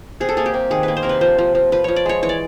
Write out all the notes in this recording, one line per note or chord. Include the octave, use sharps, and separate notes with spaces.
C3 G#4
A4
A#3 G#4
G4
C3
D#3 G#4
A#3 B4
C5
C3 A#4
B4
F3 C5
F3
F3
F3 B4
F3 C#5
D5
G#3 C#5
E3 C#5
D5